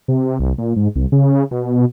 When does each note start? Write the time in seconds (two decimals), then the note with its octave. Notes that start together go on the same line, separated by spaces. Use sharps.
0.08 C3
0.39 C2
0.58 A#2
0.76 G#2
0.96 C2
1.12 C#3
1.51 B2